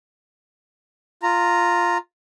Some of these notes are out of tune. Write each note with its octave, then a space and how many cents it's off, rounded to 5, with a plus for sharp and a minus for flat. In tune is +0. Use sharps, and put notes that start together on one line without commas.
F4 +0 A#5 -5